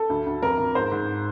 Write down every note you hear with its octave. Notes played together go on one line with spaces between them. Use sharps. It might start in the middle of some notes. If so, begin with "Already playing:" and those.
Already playing: A4
D2
D2
F2 A#4
F2
G#2 C5
G#2